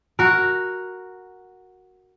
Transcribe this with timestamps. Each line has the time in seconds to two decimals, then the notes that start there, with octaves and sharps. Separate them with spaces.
0.19 F#4 A#4